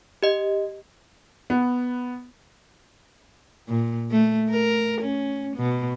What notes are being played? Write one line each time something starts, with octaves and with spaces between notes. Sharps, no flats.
G4 D#5
B3
A#2
A3
A#4
C#4
B2